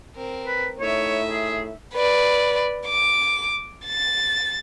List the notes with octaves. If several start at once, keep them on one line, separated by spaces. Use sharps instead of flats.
C4 A#4
B4
A2 D#4 C#5 E5
G#4
B4 D5
D6
A6